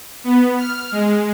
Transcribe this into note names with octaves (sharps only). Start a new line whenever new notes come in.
B3
F6
G#3